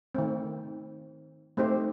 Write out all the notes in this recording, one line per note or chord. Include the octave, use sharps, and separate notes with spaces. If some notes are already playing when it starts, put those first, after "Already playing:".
D#3 A3 C4
A3 C4 D#4 G4 C5